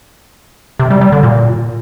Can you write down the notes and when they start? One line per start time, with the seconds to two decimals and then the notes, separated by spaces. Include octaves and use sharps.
0.79 C3
0.90 G3
1.01 G3
1.12 D3
1.23 A#2